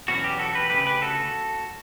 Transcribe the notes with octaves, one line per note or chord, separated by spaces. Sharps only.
E2 B2 F#3 C#4 F#4
G4
F#4 A4
G4 B4
D2 C#3 F#3 A3 G4 B4
G4 B4
F#4 A4